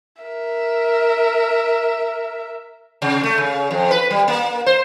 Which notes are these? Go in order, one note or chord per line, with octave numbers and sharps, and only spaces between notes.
A#4 E5
C3
A3
C#3
F2
B4
G3
A#3
C5